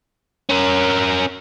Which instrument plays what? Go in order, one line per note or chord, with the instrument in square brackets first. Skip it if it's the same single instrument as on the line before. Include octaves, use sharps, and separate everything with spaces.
[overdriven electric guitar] C#4 A#4